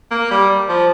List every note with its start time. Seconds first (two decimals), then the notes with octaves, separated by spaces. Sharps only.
0.11 A#3
0.31 G3
0.69 F3